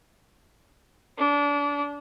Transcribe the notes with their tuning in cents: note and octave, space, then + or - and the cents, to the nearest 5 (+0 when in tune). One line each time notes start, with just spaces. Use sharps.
D4 -30